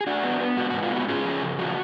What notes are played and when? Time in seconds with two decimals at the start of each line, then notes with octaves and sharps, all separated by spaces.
0.01 G#4
0.07 D4 F#4
0.24 B3
0.41 B3
0.57 G#2 F#4
0.70 F#4
0.74 G#2
0.83 F4
0.91 B3 F#4
1.08 C#4 F4 G#4
1.25 F3
1.42 C#3
1.59 F3 F#4